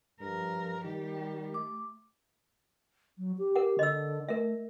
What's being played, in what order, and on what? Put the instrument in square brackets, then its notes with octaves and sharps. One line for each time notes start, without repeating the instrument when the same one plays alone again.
[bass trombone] G2 [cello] F3 A#4
[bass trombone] D#3 [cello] G3 G4
[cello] A3 [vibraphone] D6
[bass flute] F#3
G4
[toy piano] A#4 F#5
[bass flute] D3 [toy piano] D#5 E6
[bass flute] A3 [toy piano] A#4 E5